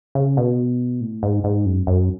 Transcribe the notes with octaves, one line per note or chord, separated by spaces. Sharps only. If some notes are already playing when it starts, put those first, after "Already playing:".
C#3
B2
A2
G#2
G#2
F#2
F#2